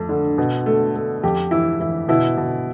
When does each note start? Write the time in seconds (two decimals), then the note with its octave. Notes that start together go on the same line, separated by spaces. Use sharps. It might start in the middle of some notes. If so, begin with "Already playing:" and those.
Already playing: F2 A3
0.09 D3
0.38 B2
0.66 A3
0.95 A3
1.24 F2 G4
1.51 E3 E4
1.80 E3 E4
2.08 B2 E4
2.37 B2